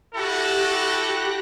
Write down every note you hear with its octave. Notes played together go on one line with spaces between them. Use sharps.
E4 F#4 G4 A4 F#6 A#6